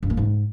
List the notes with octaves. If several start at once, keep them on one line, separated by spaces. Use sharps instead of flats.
G2
A#3
G#2